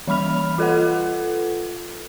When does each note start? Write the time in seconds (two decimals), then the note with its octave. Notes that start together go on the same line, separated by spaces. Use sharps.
0.08 E3 G3 B5 F6 F7
0.58 F4 A4 B4 F#5